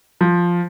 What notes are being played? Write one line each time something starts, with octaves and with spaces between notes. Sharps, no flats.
F3